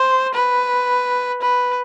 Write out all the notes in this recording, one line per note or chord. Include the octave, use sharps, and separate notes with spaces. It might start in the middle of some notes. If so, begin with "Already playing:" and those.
Already playing: C5
B4
B4